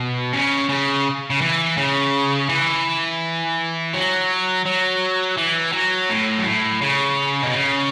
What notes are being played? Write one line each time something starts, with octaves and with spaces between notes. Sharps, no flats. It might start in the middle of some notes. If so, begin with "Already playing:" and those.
Already playing: B2
C#3
C#3
C#3
E3
C#3
E3
F#3
F#3
E3
F#3
A2
F#2
A2
C#3
B2
C#3